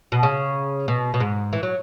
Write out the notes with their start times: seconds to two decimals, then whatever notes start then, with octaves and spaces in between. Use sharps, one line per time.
0.12 B2
0.23 C#3
0.88 B2
1.14 B2
1.20 G#2
1.53 E3
1.63 F#3